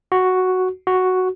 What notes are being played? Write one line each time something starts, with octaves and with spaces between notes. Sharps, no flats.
F#4
F#4